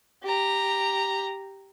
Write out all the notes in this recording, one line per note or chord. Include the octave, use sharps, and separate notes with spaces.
G4 A#5